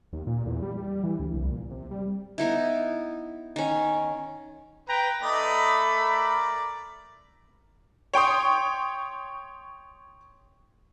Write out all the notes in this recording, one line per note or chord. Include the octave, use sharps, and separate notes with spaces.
D#2
A#2
E2
G3
G3
E3
D2
C2
A#2
C3
G3
B3 D#4 E4
D#3 C#4
B4 G5 A#5
A3 D#4 D5 B5 D#6
A#4 D5
C#5 G5 C6 D#6